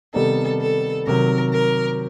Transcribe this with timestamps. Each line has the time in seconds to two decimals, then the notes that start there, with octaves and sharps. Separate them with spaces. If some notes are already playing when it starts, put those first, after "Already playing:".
0.14 C3 D#3 G3 B3 D#4 A4
0.60 A4
1.06 C3 D#3 F#3 A#4
1.53 A#4